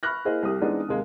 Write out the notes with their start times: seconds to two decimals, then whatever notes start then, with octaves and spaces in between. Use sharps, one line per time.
0.03 B5 C#6 F6 F#6 A#6
0.25 A#3 E4 G#4 C5 D#5
0.43 C2 G4 D#6
0.61 E3 G#3 B3 C4 D4 D#4
0.88 D#2 C3 G#3 A#3